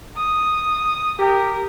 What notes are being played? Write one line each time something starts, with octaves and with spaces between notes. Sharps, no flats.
D#6
G4 A#4